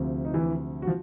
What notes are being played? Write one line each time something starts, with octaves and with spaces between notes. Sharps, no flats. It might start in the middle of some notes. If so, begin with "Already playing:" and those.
Already playing: D2 C3 F3
D#4
E3 E4
F#4
F3